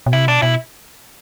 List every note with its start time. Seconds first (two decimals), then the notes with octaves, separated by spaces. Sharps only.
0.06 B2
0.13 C3 E4
0.28 B2 D4
0.42 B2 E4